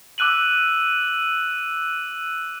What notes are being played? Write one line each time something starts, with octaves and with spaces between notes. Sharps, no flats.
D6 E6 F#6 D#7 F#7